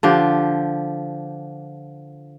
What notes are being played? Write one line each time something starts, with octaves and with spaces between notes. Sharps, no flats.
D3 F3 G4